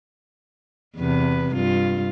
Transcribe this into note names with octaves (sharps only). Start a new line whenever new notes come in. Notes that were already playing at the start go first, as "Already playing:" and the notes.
E2 C3 B4
G2 F4